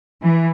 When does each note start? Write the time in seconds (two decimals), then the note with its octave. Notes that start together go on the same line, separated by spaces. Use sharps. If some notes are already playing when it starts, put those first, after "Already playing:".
0.22 E3